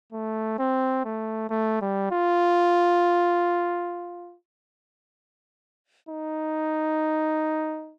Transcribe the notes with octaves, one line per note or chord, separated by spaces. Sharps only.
A3
C4
A3
A3
G3
F4
D#4